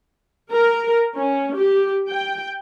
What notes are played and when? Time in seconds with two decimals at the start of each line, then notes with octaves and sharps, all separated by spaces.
0.51 A#4
1.16 C#4
1.56 G4
2.10 G5